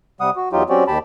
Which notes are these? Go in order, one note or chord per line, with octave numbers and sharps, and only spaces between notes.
C3 G3 F#5 D#6
F#4
E2 F#3 D#4 F4 G4
F#3 C4 C#4 F#4 G4 D5
D#2 G4 A5 B5